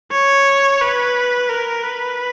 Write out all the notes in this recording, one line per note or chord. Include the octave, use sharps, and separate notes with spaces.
C#5
B4
A#4
B4